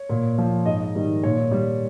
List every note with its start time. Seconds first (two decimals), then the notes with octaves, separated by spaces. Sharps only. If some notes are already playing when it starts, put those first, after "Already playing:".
Already playing: C#5
0.09 A#2
0.38 F3
0.66 G#2 D#5
0.95 D#3 G3
1.23 A#2 C#5
1.51 G3